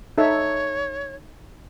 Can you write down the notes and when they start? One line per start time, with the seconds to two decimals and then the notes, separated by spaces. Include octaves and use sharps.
0.18 D#4 A4 C#5 E5